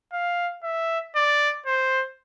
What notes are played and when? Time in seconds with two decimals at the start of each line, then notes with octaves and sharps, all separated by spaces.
0.13 F5
0.63 E5
1.16 D5
1.66 C5